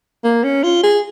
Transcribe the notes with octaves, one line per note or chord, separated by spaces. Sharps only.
A#3
C#4
F4
G#4